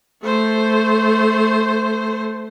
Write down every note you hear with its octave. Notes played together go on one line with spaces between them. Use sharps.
A3 C5